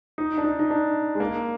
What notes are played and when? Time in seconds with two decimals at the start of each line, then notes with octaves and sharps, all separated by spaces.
0.18 D#4
0.38 D4
0.44 D#4
0.59 D#4
0.70 D4
1.15 G#3
1.20 A#3